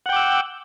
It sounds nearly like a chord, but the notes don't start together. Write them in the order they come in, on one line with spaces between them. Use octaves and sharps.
F#5 G5 D6 E6